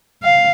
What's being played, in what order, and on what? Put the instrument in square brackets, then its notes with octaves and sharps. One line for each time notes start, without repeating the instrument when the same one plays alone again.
[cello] F5